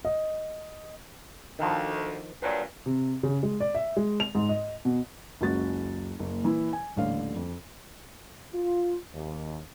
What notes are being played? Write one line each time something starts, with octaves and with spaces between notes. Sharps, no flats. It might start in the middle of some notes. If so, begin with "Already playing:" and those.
D#5
D2 D#3 F3
G2 A#2 F#3 B4 C#5 D5
C3
C#3
G#3
D5
E5
G#3
F7
G#2
D#5
B2
F#1 C#2 C#4 F#4 A6
F#1 A#3
A#2 E3 E4
G#5
D#1 A1 D3 F5
F2
F4
D#2